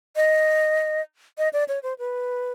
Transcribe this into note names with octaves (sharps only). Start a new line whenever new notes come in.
D#5
D#5
D5
C#5
C5
B4